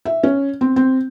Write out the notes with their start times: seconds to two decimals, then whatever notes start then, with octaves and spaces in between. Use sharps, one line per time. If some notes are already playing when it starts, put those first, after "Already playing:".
0.05 E5
0.23 C#4
0.61 C4
0.76 C4